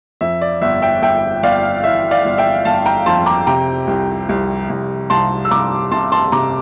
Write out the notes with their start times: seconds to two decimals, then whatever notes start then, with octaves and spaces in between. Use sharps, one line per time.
0.21 F2 E5
0.41 D5
0.61 G1 E5
0.82 E5 G5
1.02 G1 E5 G5
1.43 G1 D5 F5
1.84 E3 E5
2.11 D5 F5
2.25 G1
2.38 E5 G5
2.65 G1 F5 A5
2.86 G5 A#5
3.06 F2 A5 C6
3.26 A#5 D6
3.47 C3 G5 A#5
3.87 C2
4.29 C2
4.70 C2
5.10 C2 A5 C6
5.45 E6
5.51 C2 A#5 D6
5.91 C3 A5 C6
6.12 A5 C6
6.32 C3 A#5 D6